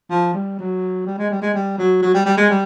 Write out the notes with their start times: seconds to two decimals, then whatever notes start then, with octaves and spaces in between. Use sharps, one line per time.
0.10 F3
0.34 G3
0.59 F#3
1.06 G3
1.18 G#3
1.31 G3
1.42 G#3
1.54 G3
1.78 F#3
2.02 F#3
2.14 G3
2.26 G3
2.37 G#3
2.50 G3